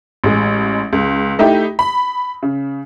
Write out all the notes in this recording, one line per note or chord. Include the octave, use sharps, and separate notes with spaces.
A1 G#3
C#2
A3 D#4 E4 G4
B5
C#3